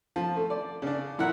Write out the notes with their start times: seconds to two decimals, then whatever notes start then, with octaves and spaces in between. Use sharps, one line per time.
0.16 F3
0.36 A3
0.50 D5
0.82 C#3 D4
1.18 A#1 E4 A#4 F#5